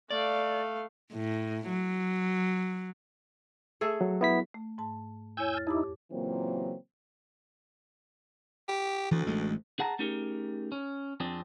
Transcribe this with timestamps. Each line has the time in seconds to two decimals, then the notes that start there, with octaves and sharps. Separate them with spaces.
0.10 A3 D5 F5
1.13 A2
1.68 F#3
3.81 A3 G#4 A4
4.01 F#3
4.21 B3 E4 B6
4.54 A3
4.78 G#2 A5
5.37 E2 E4 C#5 G#5 E6 G6
5.54 F6 A6
5.67 F2 D#4 E4 G4 D6
6.11 A#2 C#3 E3 F#3 A#3 C4
8.69 G4
9.11 D2 E3
9.26 A1 G#3 A3
9.79 G#4 F#5 A5 A#5
9.99 A3 C#4 D#4 G4 G#4 A#4
10.72 C#4
11.20 F2 C4 D4 G#4